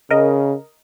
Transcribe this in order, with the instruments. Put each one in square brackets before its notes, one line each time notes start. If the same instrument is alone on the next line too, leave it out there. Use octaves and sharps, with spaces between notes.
[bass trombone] C#3 [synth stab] A#4 D#5